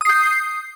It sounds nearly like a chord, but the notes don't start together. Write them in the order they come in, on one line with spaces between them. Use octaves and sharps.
D#6 C7 G6